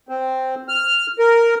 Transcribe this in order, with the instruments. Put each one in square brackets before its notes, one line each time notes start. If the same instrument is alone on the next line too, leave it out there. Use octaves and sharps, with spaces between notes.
[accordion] C4
F6
A#4